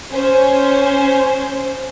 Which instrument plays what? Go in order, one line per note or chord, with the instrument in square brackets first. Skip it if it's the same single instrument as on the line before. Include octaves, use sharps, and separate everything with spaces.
[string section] C#4 C5